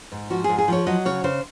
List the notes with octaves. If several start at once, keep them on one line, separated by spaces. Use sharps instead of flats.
G#2
F3 F#4
G#4
G#2
G#4
F3 C#5
F#3 D#5
C#3 C#5
C#3 C5